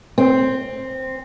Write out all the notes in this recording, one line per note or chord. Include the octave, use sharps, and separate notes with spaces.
C4